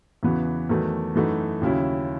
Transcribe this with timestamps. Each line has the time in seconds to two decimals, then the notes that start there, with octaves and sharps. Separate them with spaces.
0.23 E2 C#3 E3 B3 F#4
0.69 E2 D#3 F#3 A3
1.15 F#2 E3 A3 D#4 F#4
1.61 D#2 C#3 F#3 C#4 E4